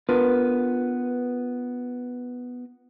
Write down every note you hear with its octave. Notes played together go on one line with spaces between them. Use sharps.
B3 D4 F4 A#4 B4